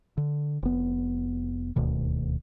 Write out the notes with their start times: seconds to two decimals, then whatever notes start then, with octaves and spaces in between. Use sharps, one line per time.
0.17 D3
0.63 F1 B3
1.76 D#1 D2 B2 D#3